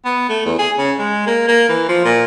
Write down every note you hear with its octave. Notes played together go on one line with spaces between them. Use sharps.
B3
A3
E2
G#4
C#3
G#3
A#3
A#3
E3
F3
A#2